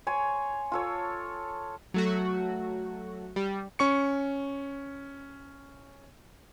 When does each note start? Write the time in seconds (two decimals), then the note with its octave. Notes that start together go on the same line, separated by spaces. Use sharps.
0.07 C#5 G#5 C6
0.72 F4 A4 C#5
1.94 F#3 A3 F#4
3.36 G3
3.79 C#4 C#6 C#7